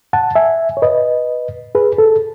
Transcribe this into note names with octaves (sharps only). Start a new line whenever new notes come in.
F#5 A5
E5 G#5
C#5
B4 D#5
G#4 B4
A4